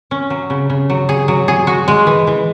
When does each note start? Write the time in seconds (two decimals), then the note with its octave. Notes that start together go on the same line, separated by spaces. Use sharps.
0.11 C#4
0.30 F#3
0.50 C#3
0.70 C#3
0.90 F#3
1.09 G#4
1.28 F#3
1.48 G#4
1.67 F#4
1.88 G#3
2.07 E3
2.27 E3